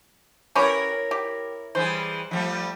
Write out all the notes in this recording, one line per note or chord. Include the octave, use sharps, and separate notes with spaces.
C#4 E4 G4 A#4 B4 C#5
G4
E3 G3 G#4 C5
F3 G3 A3